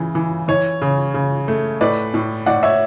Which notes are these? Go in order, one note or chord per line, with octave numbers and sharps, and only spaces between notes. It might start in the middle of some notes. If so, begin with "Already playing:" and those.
Already playing: C#3 E3
E3
E3 C#5
C#3
C#3
A3
A2 B4 D5
A2
A2 D5 F#5
C#5 E5